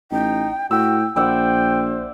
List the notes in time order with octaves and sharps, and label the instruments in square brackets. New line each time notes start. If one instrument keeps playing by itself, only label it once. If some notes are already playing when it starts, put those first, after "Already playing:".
[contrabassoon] A1 [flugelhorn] D#4 [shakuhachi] G5
[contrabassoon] A2 [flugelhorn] F#4 [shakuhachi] G5 [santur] E6
[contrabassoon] A#1 [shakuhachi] C5 [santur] D5 E5 F#5 [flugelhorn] G5